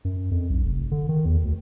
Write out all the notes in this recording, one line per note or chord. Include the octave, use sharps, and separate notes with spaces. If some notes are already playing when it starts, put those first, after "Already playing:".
F#2
F2
B1
F1
D3
D#3
E2
D2